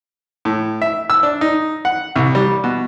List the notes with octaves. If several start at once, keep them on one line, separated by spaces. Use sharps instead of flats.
A2
E5
E6
D4
D#4
F#5
C2
G3
B2